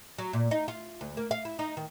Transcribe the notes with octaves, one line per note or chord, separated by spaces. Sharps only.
F#3
A#2
D#4
F4
D2
A#3
F5
E4
D#4
D#3